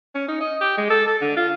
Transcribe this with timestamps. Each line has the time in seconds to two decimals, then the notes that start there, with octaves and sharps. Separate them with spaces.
0.15 C#4
0.28 D#4
0.41 D#5
0.61 G4
0.78 G#3
0.90 A4
1.08 A4
1.21 D3
1.37 F4